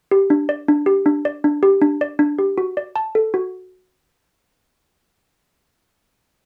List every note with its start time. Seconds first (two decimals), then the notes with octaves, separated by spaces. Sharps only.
0.11 G4
0.30 D4
0.49 D5
0.68 D4
0.86 G4
1.06 D4
1.25 D5
1.44 D4
1.63 G4
1.82 D4
2.01 D5
2.19 D4
2.39 G4
2.58 F#4
2.77 D5
2.96 A5
3.15 A4
3.34 F#4